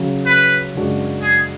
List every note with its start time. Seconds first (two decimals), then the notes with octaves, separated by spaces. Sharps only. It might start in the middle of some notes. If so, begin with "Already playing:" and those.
Already playing: C#3 F#3 C#4
0.26 B4
0.75 F#2 C#3 G#3 D4 F#4
1.23 G#4